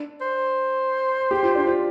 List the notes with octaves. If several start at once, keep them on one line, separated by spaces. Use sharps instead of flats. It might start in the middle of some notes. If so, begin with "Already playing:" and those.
Already playing: D4
C5
G4
F4
D4
F4